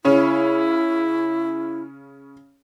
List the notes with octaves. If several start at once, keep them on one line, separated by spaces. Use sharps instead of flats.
C#3 C#4 E4